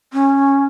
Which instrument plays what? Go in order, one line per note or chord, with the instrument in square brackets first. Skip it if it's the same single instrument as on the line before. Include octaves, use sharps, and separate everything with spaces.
[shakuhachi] C#4